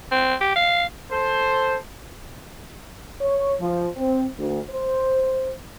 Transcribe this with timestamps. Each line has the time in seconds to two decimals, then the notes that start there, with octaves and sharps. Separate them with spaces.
0.11 C4
0.41 G4
0.56 F5
1.11 A4 C5
3.20 C#5
3.59 F3
3.97 C4
4.38 D2
4.70 C5